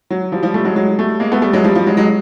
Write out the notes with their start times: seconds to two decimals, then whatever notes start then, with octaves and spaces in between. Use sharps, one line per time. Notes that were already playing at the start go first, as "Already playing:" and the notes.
0.10 F#3
0.32 F3 G3
0.43 F3 G3
0.54 G3 A3
0.65 F#3 G#3
0.76 F#3 G#3
0.98 G3 A3
1.20 G#3 A#3
1.32 A3 B3
1.42 G3 A3
1.53 F#3 G#3
1.64 F3 G3
1.75 F3 G3
1.86 F#3 G#3
1.97 F#3 G#3